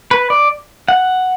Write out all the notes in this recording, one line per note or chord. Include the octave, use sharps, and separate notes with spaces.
B4
D5
F#5